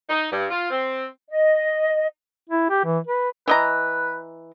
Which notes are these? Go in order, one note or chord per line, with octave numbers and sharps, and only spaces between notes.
D#4
G2
F4
C4
D#5
E4
G4
E3
B4
E3 B4 D#5 A#5